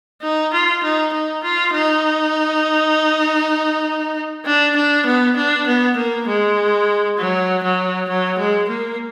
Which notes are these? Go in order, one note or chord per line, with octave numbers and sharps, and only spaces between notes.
D#4
F4
D#4
D#4
F4
D#4
D4
D4
B3
D4
B3
A#3
G#3
F#3
F#3
F#3
G#3
A#3